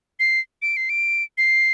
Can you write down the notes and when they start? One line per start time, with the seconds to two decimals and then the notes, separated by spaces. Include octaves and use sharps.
0.20 C7
0.62 D7
0.77 C7
0.89 D7
1.38 C7